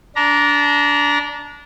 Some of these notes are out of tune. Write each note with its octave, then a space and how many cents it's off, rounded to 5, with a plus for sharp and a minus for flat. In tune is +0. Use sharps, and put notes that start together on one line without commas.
D4 -20 A#5 +10